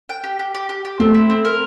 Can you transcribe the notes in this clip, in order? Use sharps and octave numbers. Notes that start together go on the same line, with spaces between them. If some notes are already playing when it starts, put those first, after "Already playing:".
G5
G4
G4
G4
G4
G4
A3 C4
E4
C4
A#4